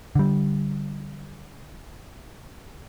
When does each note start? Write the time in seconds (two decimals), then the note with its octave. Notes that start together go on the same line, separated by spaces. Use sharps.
0.15 D3 G3